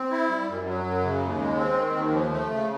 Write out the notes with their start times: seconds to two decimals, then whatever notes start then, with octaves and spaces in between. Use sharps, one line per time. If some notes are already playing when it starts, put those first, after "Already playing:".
Already playing: C4
0.11 E4
0.30 G3
0.48 F#2
0.66 F#3
0.85 F#2
1.03 C#3
1.22 D#2
1.40 G#3
1.58 C4
1.76 D#3
1.95 D#2
2.13 F3
2.31 A3
2.50 C#3